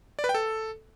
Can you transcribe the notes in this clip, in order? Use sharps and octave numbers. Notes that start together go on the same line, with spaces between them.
D5
B4
G5
A4